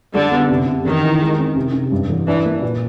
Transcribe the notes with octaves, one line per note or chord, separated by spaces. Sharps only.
D3 G3
B3
C3
C3
A1 D#3
E3
G#3
C4
C3
C3
G2
A1
E3 D4
A#3
A#2